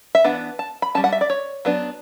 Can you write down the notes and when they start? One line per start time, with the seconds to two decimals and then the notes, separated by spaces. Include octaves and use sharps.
0.15 E5
0.24 E3 B3 D4 F#5
0.59 A5
0.82 B5
0.95 G3 C#4 A5
1.04 F#5
1.12 E5
1.21 D5
1.30 C#5
1.65 F#3 B3 D4